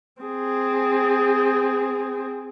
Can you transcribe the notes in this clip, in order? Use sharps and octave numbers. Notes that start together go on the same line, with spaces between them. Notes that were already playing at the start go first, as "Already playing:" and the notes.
C4 G#4